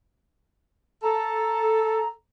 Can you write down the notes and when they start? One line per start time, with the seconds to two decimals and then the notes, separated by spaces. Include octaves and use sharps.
1.03 A4 A#5